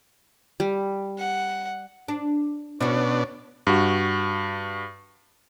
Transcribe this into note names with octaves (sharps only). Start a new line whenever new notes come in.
G3
F#5
D4
B2 C#4 D4 E4 F#4
G2 F#4